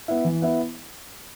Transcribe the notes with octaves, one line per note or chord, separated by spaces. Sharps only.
B3 E4
E3
B3 E4